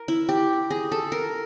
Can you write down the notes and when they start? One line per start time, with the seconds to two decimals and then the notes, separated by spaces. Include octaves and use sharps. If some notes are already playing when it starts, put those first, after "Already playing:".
Already playing: A#4
0.08 E4
0.29 G4
0.70 G#4
0.92 A4
1.12 A#4